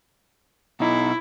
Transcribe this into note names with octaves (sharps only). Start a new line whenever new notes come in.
B2 D#4 E4